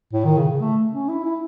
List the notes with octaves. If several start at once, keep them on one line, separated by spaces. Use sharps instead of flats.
A2
D#3
C#3
C#3
A3
C#4
E4
E4